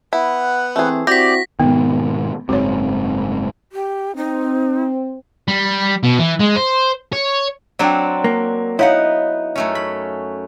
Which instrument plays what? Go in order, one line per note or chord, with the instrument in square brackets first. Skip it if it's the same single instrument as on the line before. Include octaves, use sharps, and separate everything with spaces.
[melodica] B3 B4 F#5 [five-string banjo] E4
[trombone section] E3 C4 [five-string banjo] A3 G#4
[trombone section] C4 E4 F#4 [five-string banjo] G4 [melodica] D5 [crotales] A#6 B6
[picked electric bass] G#2 B2 D#3 [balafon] B3
[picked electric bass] F#1 G#2 C4 [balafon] F#4 C#5
[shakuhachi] G4
[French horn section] C4 [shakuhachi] D#4
[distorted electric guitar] G3
B2
E3
G#3
C5
C#5
[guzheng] F#3 C4 D4 [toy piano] D5 G5
[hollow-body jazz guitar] A#3
[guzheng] B3 D#4 F#5 [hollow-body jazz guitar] E4 [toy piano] C#5 F5
[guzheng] F#2 A3 C#4
B5